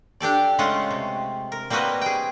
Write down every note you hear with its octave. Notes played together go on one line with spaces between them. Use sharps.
D4 G4 A4 D5
C#3 G#3 A3 C#4 F4 F#5
C3
A#4
G3 A#3 C4 F#4 B4 D#5
G#4 G5